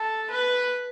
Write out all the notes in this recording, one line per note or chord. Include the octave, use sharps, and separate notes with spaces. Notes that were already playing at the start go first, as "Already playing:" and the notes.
Already playing: A4
B4